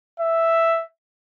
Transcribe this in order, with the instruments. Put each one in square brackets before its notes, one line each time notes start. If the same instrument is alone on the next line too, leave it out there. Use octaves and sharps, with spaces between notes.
[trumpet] E5